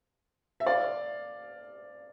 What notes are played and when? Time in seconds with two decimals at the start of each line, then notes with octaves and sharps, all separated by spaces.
0.60 E5
0.66 D5 F5